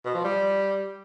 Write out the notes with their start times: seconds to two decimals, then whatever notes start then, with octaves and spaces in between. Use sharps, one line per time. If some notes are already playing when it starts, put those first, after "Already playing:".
0.05 B2
0.14 F3
0.24 G3